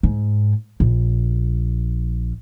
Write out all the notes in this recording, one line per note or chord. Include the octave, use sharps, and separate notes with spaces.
G#2
A#1